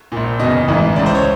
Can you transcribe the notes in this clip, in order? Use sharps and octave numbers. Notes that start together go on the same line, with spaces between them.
A#1 A#2
F#1 E2 B2 D#5
A1 G#2 E3
C#2 C#3 E3 D5
C5
C#5